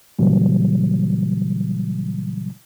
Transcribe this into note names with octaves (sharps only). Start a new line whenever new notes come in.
A#2 C#3 E3 F#3 G3